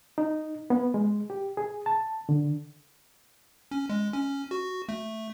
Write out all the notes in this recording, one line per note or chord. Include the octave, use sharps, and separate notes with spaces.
D#4
B3
G#3
G4
G#4
A5
D3
C#4
G#3
C#4
F#4
A3